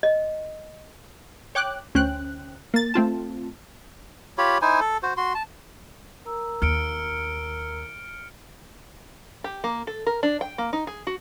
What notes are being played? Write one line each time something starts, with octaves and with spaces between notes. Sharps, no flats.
D#5
C#5 G5 D6 F#6
D2 C#4 C5 G5 F#6
A#3 A6
A3 C4 F4 A5
F4 G4 C#5 B5
D#4 E4 C5 G#5
A4
F#4 C5
F#4 C6
A5
A#4 A#5 E6
D#2 F6 C#7 D7
G4
A#3
A4
A#4
D4
G5
A#3
D#4
G#4
F#4